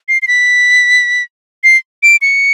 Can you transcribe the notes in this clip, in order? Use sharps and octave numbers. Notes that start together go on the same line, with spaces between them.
C7
C7
B6
C7
D7
C#7